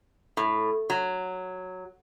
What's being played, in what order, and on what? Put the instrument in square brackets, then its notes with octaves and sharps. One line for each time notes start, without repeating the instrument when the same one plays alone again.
[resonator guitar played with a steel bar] A2
F#3